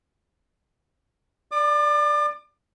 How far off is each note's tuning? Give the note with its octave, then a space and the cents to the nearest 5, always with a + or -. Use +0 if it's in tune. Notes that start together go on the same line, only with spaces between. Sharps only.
D5 +0 D6 +40